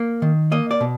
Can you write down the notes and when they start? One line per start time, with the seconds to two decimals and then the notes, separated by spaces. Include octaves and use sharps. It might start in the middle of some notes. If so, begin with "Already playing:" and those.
Already playing: A#3
0.22 D#3
0.51 A#3 D#5
0.71 D5
0.80 B2